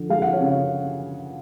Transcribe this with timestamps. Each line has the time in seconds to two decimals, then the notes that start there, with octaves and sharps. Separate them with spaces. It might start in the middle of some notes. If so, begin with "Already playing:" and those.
Already playing: D3 F3
0.09 G#3 F5
0.22 F#5
0.33 C#5 F5
0.41 C#3